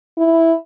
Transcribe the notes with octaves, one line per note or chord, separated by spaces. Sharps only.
E4